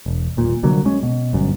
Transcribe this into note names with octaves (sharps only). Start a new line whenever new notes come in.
E1
D#1 A#2
C2 D3 F#3 A#3
G#3 C#4
B2
G1 F#2